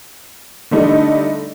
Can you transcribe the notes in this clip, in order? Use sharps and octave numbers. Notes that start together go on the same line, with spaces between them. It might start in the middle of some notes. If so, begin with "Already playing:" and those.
D3 G3 A3 D4 D#4